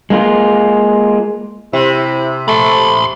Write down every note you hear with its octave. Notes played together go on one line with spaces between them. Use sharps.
G#3 A#3 D#4 F4
C3 E4
A3 B5 C6